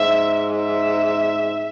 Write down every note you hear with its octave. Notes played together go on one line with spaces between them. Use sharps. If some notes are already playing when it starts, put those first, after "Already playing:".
Already playing: G#2 E5
E5